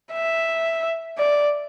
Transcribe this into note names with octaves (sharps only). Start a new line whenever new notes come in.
E5
D5